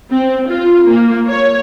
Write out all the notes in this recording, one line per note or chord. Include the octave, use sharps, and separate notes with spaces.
C4
F4
A#3
C#5